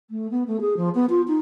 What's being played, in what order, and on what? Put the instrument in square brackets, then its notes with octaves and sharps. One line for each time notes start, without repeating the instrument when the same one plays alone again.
[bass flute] A3
B3
A3
G#4
F3
B3
F4
D#4